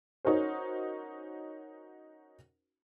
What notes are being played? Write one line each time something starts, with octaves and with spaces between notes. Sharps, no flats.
C#4 D#4 F#4 A#4 C5